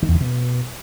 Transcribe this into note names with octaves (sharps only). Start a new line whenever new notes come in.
D#3
E2
D3
B2